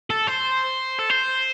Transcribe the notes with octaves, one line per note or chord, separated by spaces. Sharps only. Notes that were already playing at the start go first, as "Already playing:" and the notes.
A4
C5
A4
C5